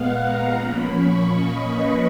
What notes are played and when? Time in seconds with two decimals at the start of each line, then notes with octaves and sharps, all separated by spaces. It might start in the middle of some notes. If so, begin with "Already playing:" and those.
Already playing: A#2 G#3 B3 F5 F#5
0.18 A#5
0.56 A#2 F3 A#3 C#4 B5
0.92 C#6
1.29 D#5
1.65 B4